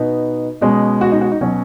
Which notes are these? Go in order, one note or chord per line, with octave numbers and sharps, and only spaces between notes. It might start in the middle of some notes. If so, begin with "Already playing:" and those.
Already playing: B2 B3 D#4
B2 G#3 C#4
F#4
D#4
F#4
D#4
B2 F#3 C#4 F#4